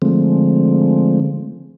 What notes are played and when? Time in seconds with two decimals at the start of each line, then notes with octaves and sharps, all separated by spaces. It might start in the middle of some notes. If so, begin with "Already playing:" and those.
0.02 D3 F3 G#3 A3 C4